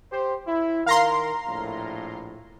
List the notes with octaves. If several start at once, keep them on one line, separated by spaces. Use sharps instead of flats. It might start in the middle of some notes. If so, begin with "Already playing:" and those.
G4 C5
E4
D#3 A#4 F5 A#5 C6
A#1 A2